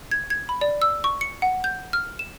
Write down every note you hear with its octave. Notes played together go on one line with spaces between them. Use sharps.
G#6
G#6
B5
D5
E6
C#6
C#7
F#5
G6
F6
E7